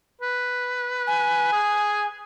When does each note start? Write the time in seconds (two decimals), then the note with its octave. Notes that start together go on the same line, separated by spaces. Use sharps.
0.21 B4
1.07 G#5
1.53 G#4